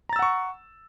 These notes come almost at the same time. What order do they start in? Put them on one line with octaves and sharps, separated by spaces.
A#5 A6 E6 F#5 C#6